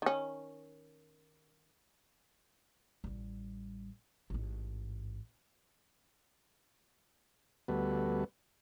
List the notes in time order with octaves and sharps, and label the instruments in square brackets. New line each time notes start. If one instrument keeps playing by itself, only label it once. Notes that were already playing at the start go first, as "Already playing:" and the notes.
[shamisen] D#3 C#4
[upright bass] A1 G3
A1 G#2
[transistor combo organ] D2 G3 B3 F#4 A4 B4